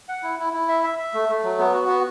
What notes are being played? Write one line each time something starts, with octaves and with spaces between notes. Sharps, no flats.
F#5
E4
E4
E4
E5
E5
E5
A3
A3
F#3
B3
F#4
B3